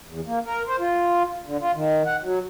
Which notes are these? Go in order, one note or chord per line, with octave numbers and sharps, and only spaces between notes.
E2
A#3
A#4
C5
F4
D3
F4
D#3
F#5
F#3